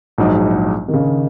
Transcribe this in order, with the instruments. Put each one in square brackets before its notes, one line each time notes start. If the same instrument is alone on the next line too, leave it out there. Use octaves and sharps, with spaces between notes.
[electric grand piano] A#1 G#2 F#3 D#4
[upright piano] D#3
C#3